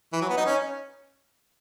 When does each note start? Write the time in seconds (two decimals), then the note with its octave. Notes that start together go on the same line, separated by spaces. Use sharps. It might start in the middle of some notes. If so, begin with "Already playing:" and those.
0.13 E3
0.21 F#3
0.29 B3
0.37 D#4
0.46 C#4